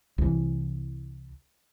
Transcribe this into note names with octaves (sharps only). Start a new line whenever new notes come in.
C2 E3